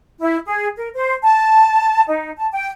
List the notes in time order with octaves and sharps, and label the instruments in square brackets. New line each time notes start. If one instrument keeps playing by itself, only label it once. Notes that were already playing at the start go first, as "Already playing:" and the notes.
[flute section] E4
G#4
A#4
C5
A5
D#4
A5
G5